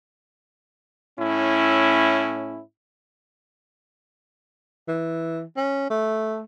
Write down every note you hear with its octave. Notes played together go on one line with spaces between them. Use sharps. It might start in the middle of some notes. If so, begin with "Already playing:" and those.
A2 C#4 E4
E3
C#4
A3